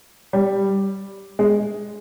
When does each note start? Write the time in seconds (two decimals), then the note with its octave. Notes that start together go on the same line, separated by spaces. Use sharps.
0.33 G3
1.39 G#3